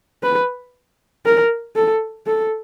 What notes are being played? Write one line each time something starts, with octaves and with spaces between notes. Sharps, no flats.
B4
A#4
A4
A4